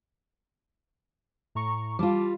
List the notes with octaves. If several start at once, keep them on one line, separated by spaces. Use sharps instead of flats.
A2 A#5 C#6
G3 F4 A5 D6